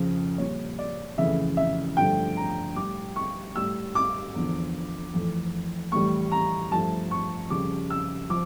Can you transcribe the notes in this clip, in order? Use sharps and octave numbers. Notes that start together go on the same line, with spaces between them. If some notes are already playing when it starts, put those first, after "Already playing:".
Already playing: F2 C#3 F3
A#2 G3 C#5
D5
F2 C#3 E3 A3 E5
E5
G2 D3 F3 A3 G5
A#5
A2 G3 D6
C#6
A2 G3 E6
D6
E2 D3 F3
F2 E3 A3
A2 E3 G3 C#6
A#5
G2 F3 A3 A5
C#6
F2 C#3 G3 D6
E6
F3 D6